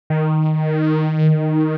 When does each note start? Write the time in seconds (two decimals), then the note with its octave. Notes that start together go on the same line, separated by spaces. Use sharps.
0.10 D#3